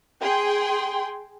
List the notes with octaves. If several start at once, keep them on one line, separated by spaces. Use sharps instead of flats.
G#4 G5 C6